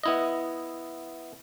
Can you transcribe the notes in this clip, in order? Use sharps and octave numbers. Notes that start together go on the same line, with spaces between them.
B3 E4 D#5